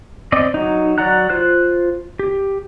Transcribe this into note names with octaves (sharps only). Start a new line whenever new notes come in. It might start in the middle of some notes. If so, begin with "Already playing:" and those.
C4 D5 D#5
F#3 D#4
F#3 D5 F#5 A#5 F#6
F4 C5 F#6
G4